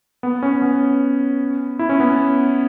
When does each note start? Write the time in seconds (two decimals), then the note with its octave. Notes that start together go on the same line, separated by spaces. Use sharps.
0.23 B3
0.42 C#4
0.62 B3
1.79 E4
1.89 C#4
2.00 B3